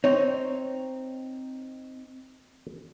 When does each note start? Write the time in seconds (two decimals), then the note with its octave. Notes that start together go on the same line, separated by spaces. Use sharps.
0.04 C4 D#4 C#5